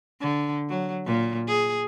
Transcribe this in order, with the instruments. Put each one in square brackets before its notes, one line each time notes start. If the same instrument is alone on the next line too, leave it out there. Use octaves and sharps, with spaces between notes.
[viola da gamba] D3
F#3
A#2
G#4